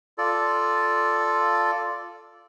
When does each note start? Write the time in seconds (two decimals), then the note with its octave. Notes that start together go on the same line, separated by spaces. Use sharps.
0.18 F4 A4 D5